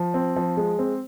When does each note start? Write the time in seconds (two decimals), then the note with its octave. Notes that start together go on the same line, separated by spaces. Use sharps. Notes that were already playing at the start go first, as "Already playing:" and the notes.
Already playing: F3
0.14 C4
0.36 F3
0.57 G#3
0.79 C4